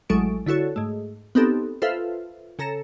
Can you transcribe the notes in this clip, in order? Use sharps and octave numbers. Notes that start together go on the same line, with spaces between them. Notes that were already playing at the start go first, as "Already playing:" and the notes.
A1 F#3 G#3 A4 C#6 D7
D3 E4 F#4 A4 C#5
G#2 A3
B3 C4 D#4 G4 A4
F4 A4 B4 C5 E5 F5
C#3 A4 A#5 A#6 C#7 E7